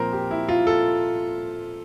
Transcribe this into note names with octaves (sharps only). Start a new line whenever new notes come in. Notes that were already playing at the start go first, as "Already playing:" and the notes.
Already playing: A#2 F3 C4 A#4 C5
G4
E4
F4
A4